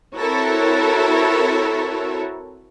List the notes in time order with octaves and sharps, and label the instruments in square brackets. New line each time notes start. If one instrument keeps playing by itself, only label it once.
[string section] C4 E4 F#4 A4 A#4 C#5